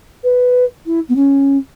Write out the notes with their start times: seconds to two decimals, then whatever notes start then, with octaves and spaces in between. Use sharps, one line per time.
0.24 B4
0.86 E4
1.09 B3
1.15 C#4